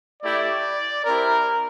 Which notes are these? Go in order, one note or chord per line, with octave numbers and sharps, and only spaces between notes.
A3 E4 G4 D5
C4 E4 G4 A#4